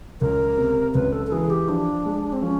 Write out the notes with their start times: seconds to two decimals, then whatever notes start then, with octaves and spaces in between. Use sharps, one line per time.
0.21 C#2 A#4
0.58 C3
0.95 C#2 B4
1.13 A4
1.27 A4
1.32 E3 G#4
1.50 G4
1.69 F3 D4
2.06 G#3
2.33 C4
2.42 F3 C#4